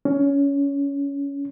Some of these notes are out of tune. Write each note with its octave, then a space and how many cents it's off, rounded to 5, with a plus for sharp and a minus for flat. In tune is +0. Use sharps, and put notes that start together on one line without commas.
C#4 +20